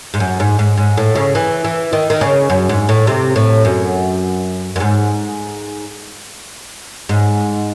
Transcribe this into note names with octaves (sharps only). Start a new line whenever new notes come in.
G#2
F#2
G#2
G#2
G#2
A2
C#3
E3
E3
D#3
D#3
C#3
F#2
G#2
A2
C3
A2
F#2
F#2
G#2
G#2